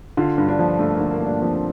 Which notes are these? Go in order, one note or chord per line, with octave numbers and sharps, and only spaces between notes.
D3 F4
G2
D4
F3
G2 A3
D3 A#3
A#3
G2
D4
F3 C4